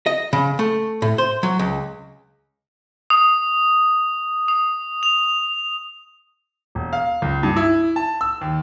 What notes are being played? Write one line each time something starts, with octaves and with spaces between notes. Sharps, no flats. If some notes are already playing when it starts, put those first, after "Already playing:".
D#5
C#3
A3
A2
C5
F#3
C#2
D#6
D#6
F7
E1
F5
C#2
G2
E4
A5
E6
D#2